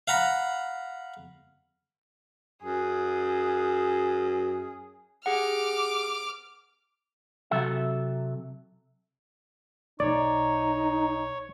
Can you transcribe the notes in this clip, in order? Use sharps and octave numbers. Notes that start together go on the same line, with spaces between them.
F5 F#5 A#5 B5
F#2 G#4
G4 G#4 F#5 D6 F6
C3 F#3 A4 E5
B1 D#4 C#5 D5